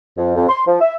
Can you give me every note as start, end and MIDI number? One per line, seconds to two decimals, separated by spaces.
0.17 0.33 41
0.36 0.47 41
0.49 0.61 84
0.67 0.77 53
0.81 0.95 76